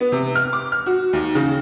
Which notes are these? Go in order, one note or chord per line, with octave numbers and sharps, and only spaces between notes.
B3
C3
F6
D6
F6
F#4
D#2
C#3